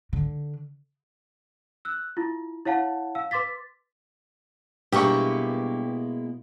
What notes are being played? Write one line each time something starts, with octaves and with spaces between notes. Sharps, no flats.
D3
E6 F#6
E4 F4
E4 C#5 F5 F#5 A5
F5 E6
B4 C6 D6 A6 B6
G2 B2 G#3 A#3 E4 G4 C#6